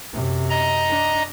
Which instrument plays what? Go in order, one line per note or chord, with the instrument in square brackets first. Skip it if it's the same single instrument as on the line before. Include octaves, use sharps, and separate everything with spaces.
[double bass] F#2 C3
[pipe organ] D#5 A#5
[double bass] D4